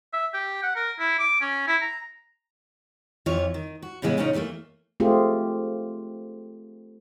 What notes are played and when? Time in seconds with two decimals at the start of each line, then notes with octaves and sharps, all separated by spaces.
0.13 E5
0.34 G4
0.63 F#5
0.76 A#4
1.00 E4
1.19 D6
1.41 C#4
1.68 E4
1.81 A#5
3.26 F2 E3 F4 C#5
3.54 D#3
3.82 F#4
4.02 A2 C#3 E3 G#3 B3
4.17 A#2 C#3 B3 C#4 D#4
4.33 E3 F#3 G3 A3 A#3
5.00 A3 C4 F4 G4 G#4